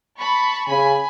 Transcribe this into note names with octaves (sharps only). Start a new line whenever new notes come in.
A5 B5 C#6
C#3 G#5 B5